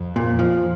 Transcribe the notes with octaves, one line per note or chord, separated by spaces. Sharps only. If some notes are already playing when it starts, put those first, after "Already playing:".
Already playing: F2
A#2
E2
F2 F3